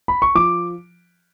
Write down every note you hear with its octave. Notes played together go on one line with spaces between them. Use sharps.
B5
C#6
F3 D6